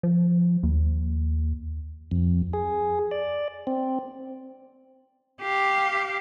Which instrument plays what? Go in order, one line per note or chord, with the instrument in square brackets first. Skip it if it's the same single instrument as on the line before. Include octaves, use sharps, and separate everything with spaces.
[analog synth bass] F3
D#2
[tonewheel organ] F2
G#4
D5
C4
[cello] G4 F5